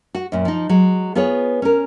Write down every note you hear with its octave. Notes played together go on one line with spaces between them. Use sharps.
F#4
F#2 A#2
F3 D#4
F#3 G#3
B3 F4 G#4 B4 C#5
C#4 A#4